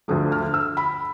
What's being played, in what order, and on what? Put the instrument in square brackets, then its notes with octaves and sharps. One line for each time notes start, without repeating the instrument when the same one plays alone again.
[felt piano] D2 D3 F3 A3 D#6
F6
E6
B5